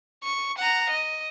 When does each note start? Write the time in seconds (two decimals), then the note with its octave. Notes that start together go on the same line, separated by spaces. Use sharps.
0.23 C#6
0.58 F#5 A#5
0.89 D#5